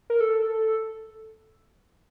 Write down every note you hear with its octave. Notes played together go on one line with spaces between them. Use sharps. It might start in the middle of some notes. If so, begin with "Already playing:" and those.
A#4
A4